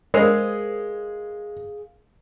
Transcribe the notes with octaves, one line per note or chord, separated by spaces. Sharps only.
G#3 G#4 A#4 C5 F5